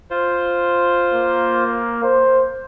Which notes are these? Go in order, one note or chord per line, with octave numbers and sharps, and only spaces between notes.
F4 C5
A#3
C5